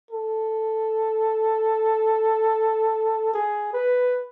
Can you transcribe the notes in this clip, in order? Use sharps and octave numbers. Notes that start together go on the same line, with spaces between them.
A4
G#4
B4